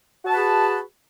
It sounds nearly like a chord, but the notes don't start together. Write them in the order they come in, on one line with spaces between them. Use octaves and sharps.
F#4 A5 B4 G#4